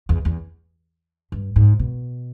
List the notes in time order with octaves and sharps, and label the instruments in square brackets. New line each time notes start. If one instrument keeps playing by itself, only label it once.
[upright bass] E2
E2
G2
G#2
B2